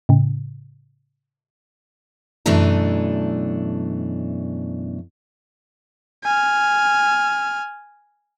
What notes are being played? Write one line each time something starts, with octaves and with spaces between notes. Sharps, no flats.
A2 C#3
F#2 B2 E3 A3 D4 A4
G#5 F6